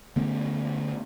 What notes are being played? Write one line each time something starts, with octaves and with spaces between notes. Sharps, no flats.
D3 A3 B3 C#4